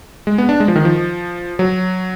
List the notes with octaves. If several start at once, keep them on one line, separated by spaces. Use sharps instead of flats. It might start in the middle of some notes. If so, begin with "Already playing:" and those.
G#3
B3
D4
G#3
F3
D#3
F3
F#3